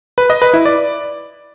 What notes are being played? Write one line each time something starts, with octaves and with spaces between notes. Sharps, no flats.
B4
D#5
B4
E4
D5